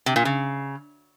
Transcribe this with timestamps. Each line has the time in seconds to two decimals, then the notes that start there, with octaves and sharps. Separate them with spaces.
0.06 C3
0.16 A#2
0.25 C#3